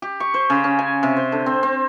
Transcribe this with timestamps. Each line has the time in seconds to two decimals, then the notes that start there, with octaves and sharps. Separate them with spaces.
0.02 G4
0.20 C#6
0.34 C5
0.50 C#3
0.64 C#4
0.79 G#5
1.03 C3
1.17 C5
1.32 D3
1.46 C4
1.63 C4